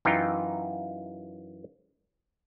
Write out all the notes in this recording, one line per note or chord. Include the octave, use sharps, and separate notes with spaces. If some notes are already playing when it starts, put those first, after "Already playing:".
F#2 E3 D#4 F4 G5 A#5